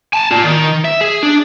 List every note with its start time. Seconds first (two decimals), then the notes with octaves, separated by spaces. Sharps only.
0.13 G#5 A5
0.31 F4 D5
0.44 D#3
0.85 E5
1.01 G#4
1.23 D4